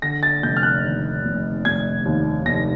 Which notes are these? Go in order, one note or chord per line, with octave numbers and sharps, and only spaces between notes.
D3 A#6
A6
F1 G6
F6
F#6
D#2
F1
F1 G#6
D#2
F1 A#6